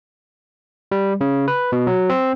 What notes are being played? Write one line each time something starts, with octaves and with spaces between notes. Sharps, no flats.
G3
C#3
B4
B2
F#3
C4